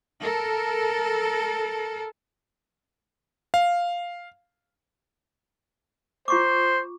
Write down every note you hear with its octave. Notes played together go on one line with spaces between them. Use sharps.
A4 A#4
F5
F4 C5 C#6 D6